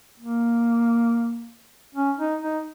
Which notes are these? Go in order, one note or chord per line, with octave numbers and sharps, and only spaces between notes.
A#3
C#4
D#4
D#4